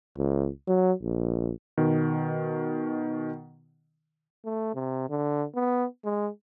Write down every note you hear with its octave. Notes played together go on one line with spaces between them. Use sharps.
C#2
F#3
A#1
B2 D#3
A3
C3
D3
B3
G#3